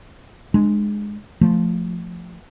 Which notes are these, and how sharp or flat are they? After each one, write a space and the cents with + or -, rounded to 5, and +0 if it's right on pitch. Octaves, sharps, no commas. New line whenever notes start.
G#3 +0 D4 +35
F3 +0 A3 +5